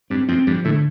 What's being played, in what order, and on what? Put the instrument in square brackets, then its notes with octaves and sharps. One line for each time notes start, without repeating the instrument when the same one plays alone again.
[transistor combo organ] G2 [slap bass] C4
[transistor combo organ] F2 [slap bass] C4
[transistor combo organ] G2 [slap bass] F3
[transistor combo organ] A2 [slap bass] D3